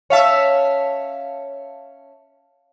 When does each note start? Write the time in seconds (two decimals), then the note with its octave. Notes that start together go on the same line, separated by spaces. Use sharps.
0.10 C#4 C#5 E5 F5 A5